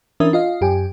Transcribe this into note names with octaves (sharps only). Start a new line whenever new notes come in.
E3 C#4 D4 A#4 E5 D#6
F4 D#5 F5
F#2 G4 G5 G#5